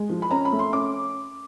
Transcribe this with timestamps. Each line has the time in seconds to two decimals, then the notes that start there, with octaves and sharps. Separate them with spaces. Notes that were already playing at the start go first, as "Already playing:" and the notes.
Already playing: G#3
0.09 F3
0.22 B5
0.31 C#4 A#5
0.45 B5
0.52 A3
0.59 C6
0.73 C#4 D6